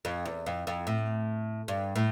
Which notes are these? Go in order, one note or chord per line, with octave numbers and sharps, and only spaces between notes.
F2
E2
F2
F2
A2
G2
A2